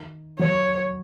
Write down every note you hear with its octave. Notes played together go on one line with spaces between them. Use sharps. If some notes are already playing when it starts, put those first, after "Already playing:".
Already playing: D#3
F#3 C#5